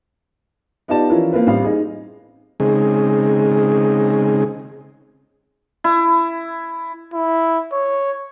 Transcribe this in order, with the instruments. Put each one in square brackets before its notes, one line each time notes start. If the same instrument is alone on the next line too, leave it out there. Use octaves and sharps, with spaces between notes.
[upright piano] B3 D#4 F4 G4 D5 A5
E3 F3 C#4 E4 F4 A#4
A#3 C4 F4 B4
A1 G3 C4 F5
D#4 G#4
[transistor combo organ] C#3 G#3 C4 D#4 G#4
[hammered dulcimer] E4
[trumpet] E4
C#5